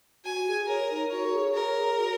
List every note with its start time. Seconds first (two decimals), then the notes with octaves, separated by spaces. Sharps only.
0.24 F#4 G#5
0.47 G#4
0.67 A#4 C#5
0.90 D#4
1.10 F#4 C#5
1.25 A#4
1.33 G#4
1.54 A#4 C#5
1.76 G#4
1.98 F#4